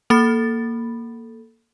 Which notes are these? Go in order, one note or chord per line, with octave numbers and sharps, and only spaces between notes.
A#3 A4 B5 A6